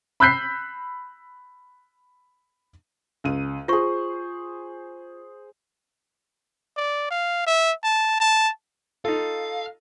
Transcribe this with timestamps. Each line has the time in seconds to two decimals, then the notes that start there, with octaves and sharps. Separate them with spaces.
0.20 B5 E6 F#6 G6 B6 C7
3.24 C#2 D#7
3.68 F4 G#4 C5 C#6
6.77 D5
7.10 F5
7.47 E5
7.84 A5
8.20 A5
9.05 D#4 F4 A4 F5